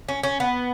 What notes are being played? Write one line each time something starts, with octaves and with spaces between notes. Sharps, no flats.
C#4
C#4
B3